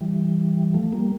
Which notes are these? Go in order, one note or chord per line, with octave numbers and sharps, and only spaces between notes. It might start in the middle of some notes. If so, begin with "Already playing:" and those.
E3 G3
F3 A3
G3 A#3